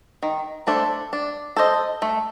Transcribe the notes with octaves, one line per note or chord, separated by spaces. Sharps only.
D#3
A3 D4 A4 C5
D4
A4 C5 D#5
A3